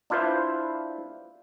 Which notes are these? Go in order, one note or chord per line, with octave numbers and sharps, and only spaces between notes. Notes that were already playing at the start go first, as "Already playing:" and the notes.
D4 E4 F4 B4 C5